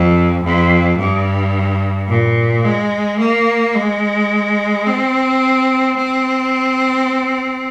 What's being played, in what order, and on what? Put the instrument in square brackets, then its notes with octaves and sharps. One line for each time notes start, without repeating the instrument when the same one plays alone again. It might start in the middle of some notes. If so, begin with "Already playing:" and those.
Already playing: [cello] F2
F2
G2
A#2
G#3
A#3
G#3
C4
C4